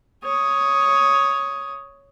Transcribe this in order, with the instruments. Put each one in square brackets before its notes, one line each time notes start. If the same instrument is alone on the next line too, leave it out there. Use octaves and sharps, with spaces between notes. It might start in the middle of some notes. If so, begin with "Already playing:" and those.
[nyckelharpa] C#5 D#6